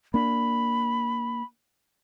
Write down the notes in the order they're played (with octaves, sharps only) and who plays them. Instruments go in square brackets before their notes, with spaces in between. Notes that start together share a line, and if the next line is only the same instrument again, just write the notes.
[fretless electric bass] A#3 D4 [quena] B5